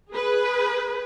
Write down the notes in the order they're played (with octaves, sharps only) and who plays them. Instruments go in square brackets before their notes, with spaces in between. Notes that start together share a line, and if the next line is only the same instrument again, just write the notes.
[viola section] G#4 B4